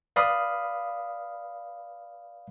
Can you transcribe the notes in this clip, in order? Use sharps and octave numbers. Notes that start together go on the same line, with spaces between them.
B4 D5 F5 B5 D#6